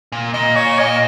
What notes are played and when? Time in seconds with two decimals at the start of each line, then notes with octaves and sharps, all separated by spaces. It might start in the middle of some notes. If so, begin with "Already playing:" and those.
0.12 A#2
0.34 A#2 D#5
0.56 C#5
0.79 D#5